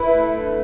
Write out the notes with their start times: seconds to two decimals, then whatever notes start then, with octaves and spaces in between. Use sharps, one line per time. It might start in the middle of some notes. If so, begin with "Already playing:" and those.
Already playing: E4 B4
0.14 A3
0.34 D3